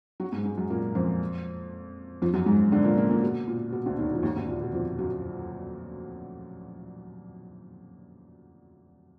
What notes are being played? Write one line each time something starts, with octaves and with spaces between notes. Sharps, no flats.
F#3 F#4
G#2 G#3
G#2 G#3
F#2 F#3
A#2 A#3
F2 F3
F2 F3
F#2 F#3
G#2 G#3
D3 D4
A#2 A#3
A#2 A#3
A#2 A#3
B2
A#2
B2
D2 D3
D#2 D#3
F3
D#2 D#3
D2 D3
A#2
B2
F2 F3
F#2 F#3